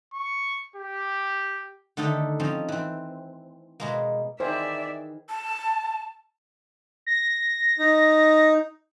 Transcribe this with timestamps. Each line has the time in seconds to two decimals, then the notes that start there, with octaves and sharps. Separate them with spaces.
0.14 C#6
0.76 G4
1.97 D3 D#3 A3 D#4 G4 A4
2.40 F3 C4 C#4 D#4
2.69 E3 C4
3.80 B2 G#3 A#3
4.40 D#3 E3 G#4 C5 D5 E5
5.29 A5
7.07 A#6
7.79 D#4